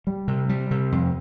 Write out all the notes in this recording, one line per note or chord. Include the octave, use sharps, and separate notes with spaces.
G3
C3
G3
C3
F2